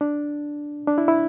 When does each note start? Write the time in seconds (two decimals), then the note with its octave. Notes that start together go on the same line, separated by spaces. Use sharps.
0.01 D4
0.87 D4
0.98 E4
1.08 E4